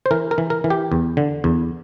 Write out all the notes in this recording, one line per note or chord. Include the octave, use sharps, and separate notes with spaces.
C5
E3 A#4
A#4
E3
A#4
E3
G4
E2
D3
E2